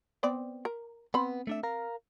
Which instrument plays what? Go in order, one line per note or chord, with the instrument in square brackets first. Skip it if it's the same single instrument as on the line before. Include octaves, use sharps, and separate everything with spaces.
[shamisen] B3 C4 D5
A#4
[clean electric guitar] B3 [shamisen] C4 B5
[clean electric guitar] A3 D4 E5
A#4 F5 A#5